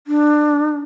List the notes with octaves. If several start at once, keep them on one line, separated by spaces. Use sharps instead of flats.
D4